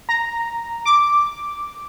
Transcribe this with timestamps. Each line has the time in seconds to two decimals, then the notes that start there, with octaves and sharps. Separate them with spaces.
0.09 A#5
0.85 D6